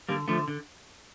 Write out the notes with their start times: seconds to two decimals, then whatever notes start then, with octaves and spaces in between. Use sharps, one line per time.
0.09 D3 G3 A#3
0.28 D3 F3 A3
0.48 D3